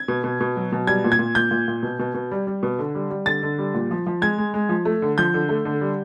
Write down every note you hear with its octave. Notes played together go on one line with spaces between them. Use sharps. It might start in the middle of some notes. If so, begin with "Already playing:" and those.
Already playing: G#6
B2
B2
B2
F#3
B2
G3 G#6
A#2
G#6
A#2
A#2 G6
A#2
A#2
B2
B2
B2
G3
G3
B2
D3
G3
G3
D3 A6
D3
G3
A#2
F3
F3
G#3 G#6
G#3
G#3
F3
A3
D3
F3 G6
D3
A3
D3
G3